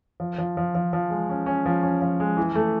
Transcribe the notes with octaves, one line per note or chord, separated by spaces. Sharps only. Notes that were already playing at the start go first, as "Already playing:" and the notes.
F3
F3
F3
F3
F3
G#3
C#4
C#4
F3
C#4
F3
G#3
E3
A3